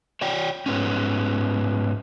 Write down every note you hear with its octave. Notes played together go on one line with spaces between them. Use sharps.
C#5 D5 G5
G#2 B3 C#4